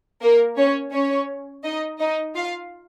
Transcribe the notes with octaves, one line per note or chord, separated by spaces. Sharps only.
A#3 A#4
C#4 C#5
C#4 C#5
D#4 D#5
D#4 D#5
F4 F5